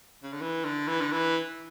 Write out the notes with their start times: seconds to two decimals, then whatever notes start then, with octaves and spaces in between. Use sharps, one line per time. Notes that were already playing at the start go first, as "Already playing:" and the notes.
0.23 C#3
0.33 D3
0.41 E3
0.65 D3
0.87 E3
1.01 D3
1.12 E3